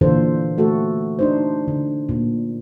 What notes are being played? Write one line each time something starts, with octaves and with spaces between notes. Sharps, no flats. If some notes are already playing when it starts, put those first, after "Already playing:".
A#2 D3 E3 F4 A4 C5
A3 F#4 A4
D4 D#4 C5
D3
A#2